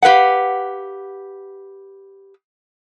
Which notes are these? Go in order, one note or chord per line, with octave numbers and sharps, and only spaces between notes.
G4 B4 F5 F#5